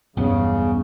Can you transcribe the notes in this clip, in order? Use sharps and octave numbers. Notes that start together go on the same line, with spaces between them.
B1 E2 G2 C#3 B3